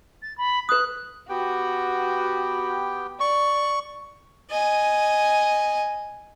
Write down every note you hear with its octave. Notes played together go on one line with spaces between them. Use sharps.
A6
B5
B4 D#6 F#6
B3 F#4 G4 G5
D5 C#6
D#5 G#5